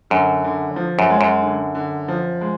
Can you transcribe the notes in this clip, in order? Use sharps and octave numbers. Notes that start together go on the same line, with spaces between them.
F#2 D3
D3
F3
F#2
G#3
F#2
D3
D3
F3
G#3